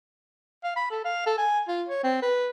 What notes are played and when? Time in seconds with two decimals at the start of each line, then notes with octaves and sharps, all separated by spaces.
0.63 F5
0.76 B5
0.91 A4
1.04 F5
1.26 A4
1.37 G#5
1.68 F4
1.89 C#5
2.03 C4
2.22 B4